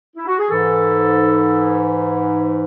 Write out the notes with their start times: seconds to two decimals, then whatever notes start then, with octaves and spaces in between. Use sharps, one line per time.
0.16 E4
0.27 F#4
0.39 G#4
0.50 G#2 E3 A4